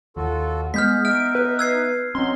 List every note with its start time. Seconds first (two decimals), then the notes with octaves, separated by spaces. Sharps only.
0.17 D#2 F4 F#4 A4
0.74 G#3 B3 G#4 F6 G6 B6
1.05 D#4 E5 F6 D7
1.35 B4
1.59 E6 G#6 C7
2.15 F#3 C4 C#4 D#4 C6